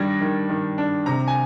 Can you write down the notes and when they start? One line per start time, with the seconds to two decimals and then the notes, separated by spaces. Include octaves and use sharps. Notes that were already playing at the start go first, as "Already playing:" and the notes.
Already playing: D#3 G3 D4 G#6 A#6
0.21 D#3
0.49 D#3
0.78 D4
1.06 C3 A#5
1.28 G#5